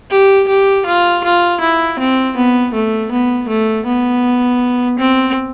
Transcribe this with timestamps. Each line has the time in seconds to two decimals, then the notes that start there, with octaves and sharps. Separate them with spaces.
0.11 G4
0.48 G4
0.86 F4
1.24 F4
1.61 E4
1.99 C4
2.36 B3
2.74 A3
3.12 B3
3.49 A3
3.86 B3
4.99 C4